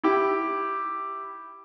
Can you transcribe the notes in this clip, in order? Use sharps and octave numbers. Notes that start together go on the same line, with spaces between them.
E4 G4